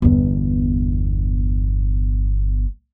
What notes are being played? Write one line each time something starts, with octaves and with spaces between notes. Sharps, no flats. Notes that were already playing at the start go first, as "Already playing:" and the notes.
G1 E2